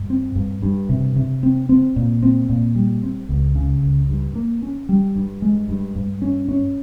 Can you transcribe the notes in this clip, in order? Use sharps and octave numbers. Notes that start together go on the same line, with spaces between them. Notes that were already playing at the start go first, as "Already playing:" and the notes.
Already playing: G2
C4
G2
G2
C3
C3
C4
C4
A#2
C4
A#2
G3
C4
C#2
C#3
C#2
G2
A#3
C#4
G3
G2
G#3
G2
G2
C#4
C#4